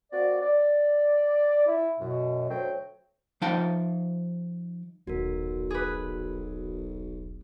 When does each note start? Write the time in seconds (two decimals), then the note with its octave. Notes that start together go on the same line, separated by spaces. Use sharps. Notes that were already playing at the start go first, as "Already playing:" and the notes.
0.12 A#3 C4 F#4 D5
0.41 D5
1.67 E4
2.00 F#2 B2
2.50 D2 F#3 A3 F#4 C5 G5
3.42 F3 D#4 F5 G5 A5
5.07 D#1 B1 F#4 A#4
5.71 G#4 B4